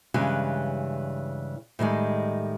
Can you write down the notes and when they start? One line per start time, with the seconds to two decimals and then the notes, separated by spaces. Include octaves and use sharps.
0.14 G2 C#3 E3 G#3
1.79 A2 D#3 G3 G#3